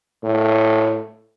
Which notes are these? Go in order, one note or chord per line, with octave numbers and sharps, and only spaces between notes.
A2